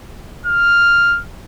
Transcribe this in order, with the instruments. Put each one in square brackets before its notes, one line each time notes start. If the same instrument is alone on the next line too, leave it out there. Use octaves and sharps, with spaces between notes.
[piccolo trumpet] F6